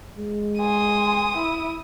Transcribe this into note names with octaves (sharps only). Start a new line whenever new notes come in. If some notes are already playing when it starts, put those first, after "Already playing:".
G#3
G#5 C6 D#6
E4